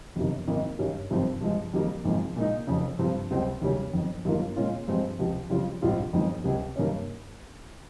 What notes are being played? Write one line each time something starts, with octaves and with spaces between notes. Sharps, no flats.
G1 F2 C3 D#3
G#1 G#2 D#3 A#3
G2 D#3 G3 C#4
G#1 G2 F3 C4
G2 F3 G#3
F2 D#3 G3 A#3
G#1 G#2 F3 G#3
A#2 G#3 D#4
F1 F2 C#3
G2 F3 C4 F4
C#2 C3 G3 C4
D#2 C#3 G3 C#4
G1 F2 D#3
G1 G2 D#3 A#3 F4
A#2 G#3 C#4 F4
G2 F3 G#3 C4
C#2 C3 F3
F2 C#3 G3 C#4 F4
A#1 G#2 G3 C4 F4
G1 F2 D#3 G#3 D#4
C#2 C3 G3
G2 D#3 A#3 C#4